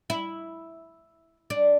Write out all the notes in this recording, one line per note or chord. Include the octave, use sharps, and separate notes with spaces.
E4
D4